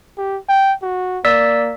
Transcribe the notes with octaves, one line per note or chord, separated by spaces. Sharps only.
G4
G5
F#4
A#3 D5 E6 B6